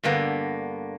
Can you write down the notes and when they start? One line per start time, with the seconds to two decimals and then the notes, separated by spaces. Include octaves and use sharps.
0.03 G2 D3 A#3 B3